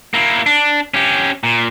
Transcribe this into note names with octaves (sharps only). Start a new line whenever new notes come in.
A#3 E4
D4
C#4 G4
A#2